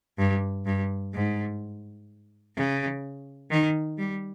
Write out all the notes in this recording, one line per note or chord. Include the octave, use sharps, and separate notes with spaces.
G2
G2
G#2
C#3
D#3
G3